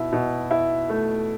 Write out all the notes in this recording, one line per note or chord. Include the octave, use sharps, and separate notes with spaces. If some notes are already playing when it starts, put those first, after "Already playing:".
Already playing: B2 E4
B2
E4
A3